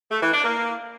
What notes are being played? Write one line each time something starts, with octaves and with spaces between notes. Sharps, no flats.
A3
E3
D4
A#3